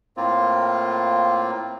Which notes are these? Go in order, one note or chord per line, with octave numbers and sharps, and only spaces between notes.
A2 A#3 C4 F4